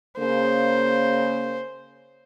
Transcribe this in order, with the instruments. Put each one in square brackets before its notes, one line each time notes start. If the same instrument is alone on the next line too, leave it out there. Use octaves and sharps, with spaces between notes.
[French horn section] C#3 A#3 [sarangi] C5